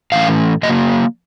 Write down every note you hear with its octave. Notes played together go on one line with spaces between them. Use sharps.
A2 E3 A3 C#4 F5
C#3 F#3 A#3 D#5